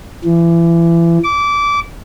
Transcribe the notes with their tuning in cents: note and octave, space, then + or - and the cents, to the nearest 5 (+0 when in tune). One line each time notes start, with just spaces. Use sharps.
E3 +30
D6 -20